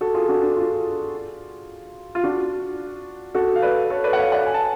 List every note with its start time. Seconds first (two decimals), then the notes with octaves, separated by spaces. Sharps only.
0.01 F#4 A4
0.14 F4 G#4
0.29 D4 F#4
0.42 D4
0.57 F4
2.15 F4
2.24 D4 F#4
3.35 F#4 A4
3.56 F5
3.62 B4 D5
3.90 A4 C#5
4.04 B4 D5
4.13 F#5
4.19 C#5 F5
4.32 D5 F#5
4.47 G#5
4.54 A5